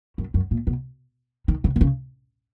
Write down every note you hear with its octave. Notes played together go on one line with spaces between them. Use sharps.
F#2
F#2
A#2
B2
D#3
C#3
D#3
C#3